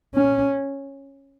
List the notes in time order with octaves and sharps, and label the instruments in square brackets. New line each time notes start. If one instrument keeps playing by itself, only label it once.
[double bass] C#4